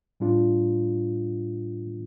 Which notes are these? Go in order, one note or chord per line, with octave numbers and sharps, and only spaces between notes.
A2 G3 D4 F4